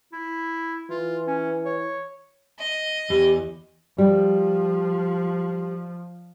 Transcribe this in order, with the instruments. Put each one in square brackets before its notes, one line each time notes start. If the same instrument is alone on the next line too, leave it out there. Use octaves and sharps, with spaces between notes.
[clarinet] E4
[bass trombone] E3 [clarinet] F4
[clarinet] C#4
C#5
[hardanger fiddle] D#5
[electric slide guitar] E2 E3 [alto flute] G4
[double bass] F3 [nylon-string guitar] G3